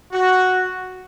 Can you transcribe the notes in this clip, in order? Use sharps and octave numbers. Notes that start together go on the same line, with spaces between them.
F#4